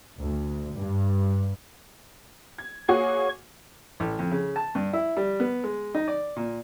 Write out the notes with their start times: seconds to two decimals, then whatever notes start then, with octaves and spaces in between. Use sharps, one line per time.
0.21 D2
0.78 G2
2.58 G#6
2.88 A#3 F#4 G#4 C#5 C#6
4.00 A1
4.19 F2
4.31 C#3
4.56 A5
4.75 G2
4.93 E4
5.17 G3
5.40 B3
5.64 G#3
5.95 D#4
6.08 D5
6.36 A#2